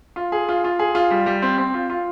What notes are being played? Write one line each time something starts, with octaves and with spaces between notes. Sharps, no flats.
F4
G#4
F4
F4
G#4
F4
G3
G3
C4
C4
F4
F4